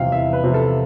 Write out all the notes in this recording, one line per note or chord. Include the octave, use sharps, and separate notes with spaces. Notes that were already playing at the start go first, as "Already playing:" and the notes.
Already playing: E2 C3 F3 F5 G5
E2 E5
B4
C3 F3
A4